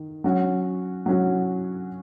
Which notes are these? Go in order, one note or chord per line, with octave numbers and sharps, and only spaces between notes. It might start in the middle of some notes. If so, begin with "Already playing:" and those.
Already playing: D#3
F#3 C#4 F#4
F#3 C#4 F#4